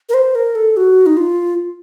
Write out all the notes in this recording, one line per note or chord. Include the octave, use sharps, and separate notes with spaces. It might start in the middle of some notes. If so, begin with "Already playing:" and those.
A#4
C5
A#4
A4
F#4
D#4
F4